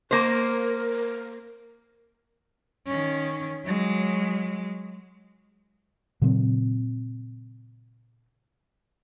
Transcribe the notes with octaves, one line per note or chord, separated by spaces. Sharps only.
A#3 A#4 C5
D#3 C#4
F#3 G#3
A#2 C#3 F#3 C4